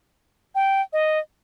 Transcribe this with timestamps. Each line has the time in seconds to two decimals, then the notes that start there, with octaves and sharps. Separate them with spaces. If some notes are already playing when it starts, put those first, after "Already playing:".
0.55 G5
0.93 D#5